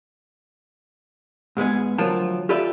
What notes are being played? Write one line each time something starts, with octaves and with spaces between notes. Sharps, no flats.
G#2 G#3 B3 G#4
D2 F3 F#3 F4 A#4 A5
F4 G4 A4 B4 D5 E5